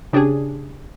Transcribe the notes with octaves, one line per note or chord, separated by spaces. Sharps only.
C#3 D4 G4 G#4